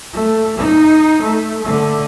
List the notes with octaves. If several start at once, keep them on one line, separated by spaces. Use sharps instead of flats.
A3
D#4
A3
D3 A3